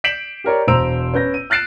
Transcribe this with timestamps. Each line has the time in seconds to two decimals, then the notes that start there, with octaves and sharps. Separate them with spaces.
0.04 G6 B6 C7 D7 E7 F#7
0.44 G4 A#4 C#5 D5
0.68 E1 C5 A#5 E6 D7 F7
1.14 C#4 B4 G6 A#6
1.34 D#7
1.50 F6 F#6 A6 C7 D7 E7